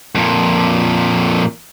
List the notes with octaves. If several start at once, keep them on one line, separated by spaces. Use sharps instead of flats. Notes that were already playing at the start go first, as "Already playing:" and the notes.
F2 A#2